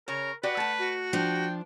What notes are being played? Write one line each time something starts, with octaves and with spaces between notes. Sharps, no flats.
C#3 A#4 C#5
F#4 G4 B4 D5 F#5
A3 A5
F#4
F3 D4 G5